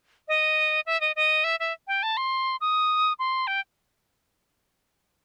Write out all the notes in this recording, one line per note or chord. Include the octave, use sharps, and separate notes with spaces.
D#5
E5
D#5
D#5
E5
E5
G5
A5
C6
D#6
C6
G5